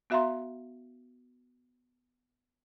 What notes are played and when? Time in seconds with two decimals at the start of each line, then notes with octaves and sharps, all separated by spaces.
0.10 B3 F#4 E5 F5 A#5 C6